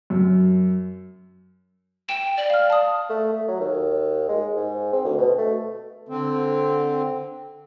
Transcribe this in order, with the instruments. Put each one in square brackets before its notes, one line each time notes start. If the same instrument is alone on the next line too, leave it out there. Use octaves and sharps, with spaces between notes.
[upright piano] F#2
[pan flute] G5 [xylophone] E7
[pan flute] D5
[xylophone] F5 F6
A5 D#6
[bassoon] A3
A3
F#3
D#2
G#3
G#2
C4
D2
B2
A3
[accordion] D3 C4